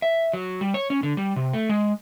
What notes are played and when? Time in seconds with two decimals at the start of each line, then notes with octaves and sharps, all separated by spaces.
0.02 E5
0.33 F#3
0.61 G3
0.74 C#5
0.90 C#4
1.03 D3
1.17 G3
1.36 C3
1.53 A3
1.69 G#3